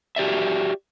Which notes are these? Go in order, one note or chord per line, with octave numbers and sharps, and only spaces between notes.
F#4 G4 D5 E5